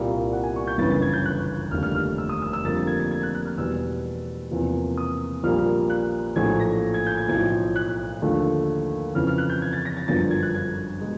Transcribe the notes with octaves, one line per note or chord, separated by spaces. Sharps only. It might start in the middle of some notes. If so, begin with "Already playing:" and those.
Already playing: C2 A#2 G3 A#3 F5
F#5
G#5
C#6
G6
G1 F#2 C#3 E3 A6
A6
G#6
G6
F#6
F1 D#2 D3 G3 F6
F6
F6
E6
D#6
E6
E6
F2 D3 G3 A#3 A6
A6
G#6
A6
G#6
F#6
F#6
F6
E2 B2 G3 E6
E2 C3 F3 A#3
D#6
A#1 A#2 G3 A#3 F6
F#6
A#1 A2 F#3 A3 G#6
A#6
G#6
G6
G#6
B1 A2 F3 G#6
F#6
D#2 D3 F3 A3
F2 C#3 E3 F6
F6
F#6
G6
G#6
A6
A#6
A6
G1 F#2 D3 F3 A6
A6
G#6
F#6
G#6
B2 G#3